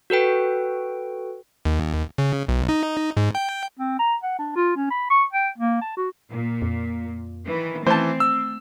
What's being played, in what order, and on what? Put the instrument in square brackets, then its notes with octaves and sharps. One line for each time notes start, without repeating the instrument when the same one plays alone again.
[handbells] F#4 A4 B4 G5
[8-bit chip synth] D#2
C#3
B1
D#4
G#2
G5
[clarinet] C4
A#5
F#5
D4
F4
C#4
B5
C#6
G5
A#3
A5
F#4
[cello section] A#2
[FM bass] F2
[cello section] D#3 E3
[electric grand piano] E3 [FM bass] A3 [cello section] C4 [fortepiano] C5 A5
[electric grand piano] E6